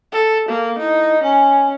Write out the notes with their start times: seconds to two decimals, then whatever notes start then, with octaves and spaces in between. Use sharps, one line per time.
0.13 A4
0.49 A#3
0.79 D#4 E4
1.23 C#4 G#5